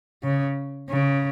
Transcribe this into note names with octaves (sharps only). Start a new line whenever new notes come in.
C#3
C#3